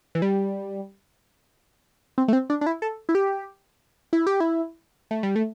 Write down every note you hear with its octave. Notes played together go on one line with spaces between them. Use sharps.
E3
G3
C4
A3
C4
D4
D4
E4
A4
E4
G4
E4
G4
E4
A3
G3
A3